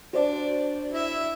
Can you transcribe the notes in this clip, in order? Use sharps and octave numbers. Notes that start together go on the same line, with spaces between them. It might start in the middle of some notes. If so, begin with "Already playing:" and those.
D4 F#4 C5 D5
E4 E5